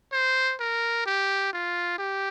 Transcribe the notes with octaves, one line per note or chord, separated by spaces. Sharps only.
C5
A#4
G4
F4
G4